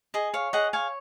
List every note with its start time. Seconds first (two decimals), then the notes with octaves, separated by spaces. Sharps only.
0.14 G#4 D#5
0.34 C#5 F5
0.53 G#4 D#5 F#5
0.73 C#5 F5 G#5